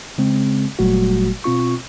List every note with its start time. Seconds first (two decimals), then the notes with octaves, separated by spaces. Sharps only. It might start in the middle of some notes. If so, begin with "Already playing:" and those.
0.18 C#3 G#3 C4
0.79 G1 A#2 F#3 G3 A3 F#4
1.44 B2 C4 F4 C#6